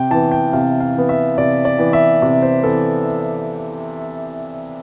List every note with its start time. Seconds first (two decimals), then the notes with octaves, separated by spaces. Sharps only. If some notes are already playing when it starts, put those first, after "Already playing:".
Already playing: C3 G5
0.10 E3 A5
0.15 B3
0.32 G5
0.53 C3 F5
0.80 F5
0.94 E3 B3
1.09 E5
1.38 C3 D5
1.65 D5
1.79 E3 B3
1.93 E5
2.22 C3
2.42 C5
2.64 E3 B3 A4